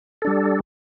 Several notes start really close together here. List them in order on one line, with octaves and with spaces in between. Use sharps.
A4 D4 G3